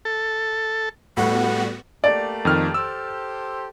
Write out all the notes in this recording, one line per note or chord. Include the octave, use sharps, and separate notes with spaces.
A4
A2 G3 B3 F#4 F#5
A3 A#3 G4 D5
F2 D#3 F6
G4 A4 C5 E6